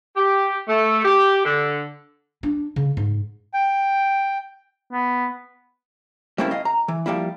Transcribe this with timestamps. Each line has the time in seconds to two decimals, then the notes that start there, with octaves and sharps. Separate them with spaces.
0.16 G4
0.67 A3
1.04 G4
1.45 D3
2.43 D4
2.76 C#3
2.97 G#2
3.54 G5
4.92 B3
6.38 G3 A3 A#3 C4 C#4 E4
6.51 D#5 F5
6.65 A#5
6.88 E3
7.06 F3 G3 A#3 E4